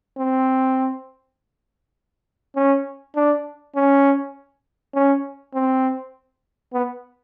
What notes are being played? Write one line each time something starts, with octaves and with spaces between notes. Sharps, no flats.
C4
C#4
D4
C#4
C#4
C4
B3